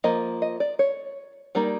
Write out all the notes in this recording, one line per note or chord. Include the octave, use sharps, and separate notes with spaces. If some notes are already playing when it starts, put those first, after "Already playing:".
F3 A#3 D#5
D#5
D5
C#5
G3 A#3 D#4 D5